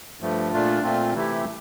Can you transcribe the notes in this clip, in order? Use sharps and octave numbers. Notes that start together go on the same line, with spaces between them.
G2 F3 A3
A#2 A3 D4 F4
A#2 A3 C4 F4
C3 E3 A3 E4 G4